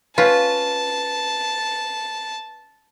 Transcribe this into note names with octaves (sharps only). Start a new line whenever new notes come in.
C#4 F4 B4 A5